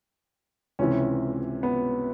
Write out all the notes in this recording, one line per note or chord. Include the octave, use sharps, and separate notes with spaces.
C#2 C3 E3 C#4
B3